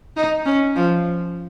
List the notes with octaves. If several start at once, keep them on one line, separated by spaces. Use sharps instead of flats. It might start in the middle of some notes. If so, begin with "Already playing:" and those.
D#4
C#4
F3